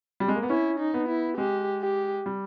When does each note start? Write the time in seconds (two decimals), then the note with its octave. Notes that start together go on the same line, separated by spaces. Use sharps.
0.20 G3
0.28 G#3
0.35 A#3
0.43 B3
0.50 C#4 E4
0.80 D#4
0.94 B3
1.08 E4
1.37 G#3 G4
1.81 G4
2.26 G3